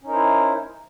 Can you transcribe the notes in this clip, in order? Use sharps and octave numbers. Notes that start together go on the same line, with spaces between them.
C#4 D#4 E4 A#4 C5